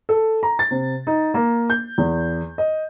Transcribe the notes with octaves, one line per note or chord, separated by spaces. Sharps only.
A4
A#5
A6
C3
D#4
A#3
G6
E2
D#5